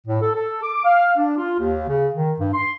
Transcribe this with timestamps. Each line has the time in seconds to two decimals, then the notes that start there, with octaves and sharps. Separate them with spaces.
0.07 A2
0.21 A4
0.35 A4
0.63 D6
0.84 F5
1.17 D4
1.38 F4
1.60 D#2
1.88 C#3
2.14 D#3
2.40 G2
2.54 C6